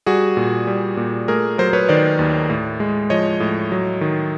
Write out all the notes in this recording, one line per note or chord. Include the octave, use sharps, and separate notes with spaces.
G3 F#4 G#4
A#2
G3
A#2
A3 G#4 A#4
F#3 A#4 C5
B4 C#5
D#3 C5 D5
D#2
A2
G#3
F3 C#5 D#5
A2
F#3
D#3